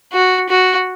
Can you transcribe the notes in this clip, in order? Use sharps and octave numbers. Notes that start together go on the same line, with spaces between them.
F#4
F#4